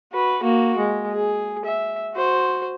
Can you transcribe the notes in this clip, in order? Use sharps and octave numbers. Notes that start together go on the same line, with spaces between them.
F#4 B4
A#3 F#4
G#3
G#4
E5
F#4 C5